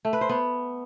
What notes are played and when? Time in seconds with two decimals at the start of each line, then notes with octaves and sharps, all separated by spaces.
0.05 A3
0.13 B4
0.21 C5
0.29 B3